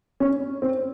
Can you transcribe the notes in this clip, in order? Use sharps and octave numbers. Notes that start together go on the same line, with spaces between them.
C#4
C4